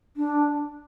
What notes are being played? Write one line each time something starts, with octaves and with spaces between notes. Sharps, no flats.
D4